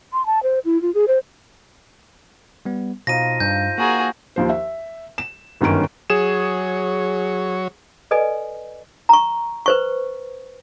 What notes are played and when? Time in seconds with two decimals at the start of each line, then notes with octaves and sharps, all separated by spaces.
0.13 C6
0.26 A5
0.43 C5
0.65 E4
0.82 F4
0.94 G#4
1.08 C5
2.65 G3 B3
3.07 B2 F3 D#4 F5 A#6 D#7
3.40 G2 G6
3.78 A#3 F#4 G#4 A#4 G5
4.36 D#2 F3 C5
4.50 E5
5.18 E7
5.61 G1 F#2 D#3 C#4 D7
6.10 F#3 G#4 C#5 E7
8.11 A4 B4 D5 D#5 G#5
9.09 A#5 C#6
9.66 B4 C5 C#6